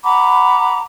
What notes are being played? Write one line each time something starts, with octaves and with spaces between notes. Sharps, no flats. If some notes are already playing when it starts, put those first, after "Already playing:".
F#5 A#5 B5 D6